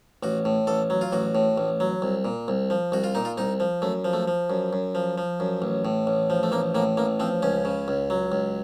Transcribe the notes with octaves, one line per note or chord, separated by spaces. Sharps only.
A1 F#4
A2
A1 A4
F#3
F4
A1 F#4
A2
A1
F#3
C2
A#2
C2
F3
C2 F#4
F4
A#2 D#4
F4
C2 D#4
F3
F#2 A3
F3
A3
F3
F#2
F#2
F3
F3
F#2
A1
A2
A1
F3
A3
A1 A#3
A2 A#3
A1 A#3
F3 C4
C#2 C#4
C#3
C#2
F#3
C#2